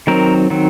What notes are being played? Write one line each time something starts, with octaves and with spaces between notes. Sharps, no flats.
D#3 F#3 C4 A#4
D#3 F#3 C4